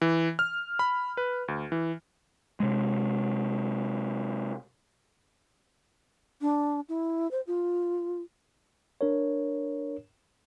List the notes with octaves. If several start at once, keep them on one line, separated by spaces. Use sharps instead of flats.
E3
F6
B5
B4
D2
E3
C3 G#3
D4
E4
C5
F4
D4 A#4 C#5